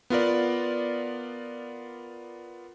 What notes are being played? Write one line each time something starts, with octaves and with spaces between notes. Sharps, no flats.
B3 F4 A#4 D5